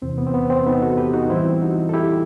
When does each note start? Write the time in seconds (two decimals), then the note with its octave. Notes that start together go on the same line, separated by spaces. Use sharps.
0.02 E2 C3 E3 C4
0.18 B3
0.27 C4
0.34 B3
0.50 C4
0.66 B3 D#4
0.82 F#4 A4
0.97 G4 B4
1.13 D#4 F#4
1.30 A2 E3 G3 C4 E4
1.62 D#4 F#4
1.89 A4
1.93 E4 G4